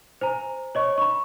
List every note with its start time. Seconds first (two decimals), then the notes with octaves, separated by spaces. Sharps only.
0.21 C5 G#5 A#5
0.75 C#5 D#5 C#6
0.98 B5 C#6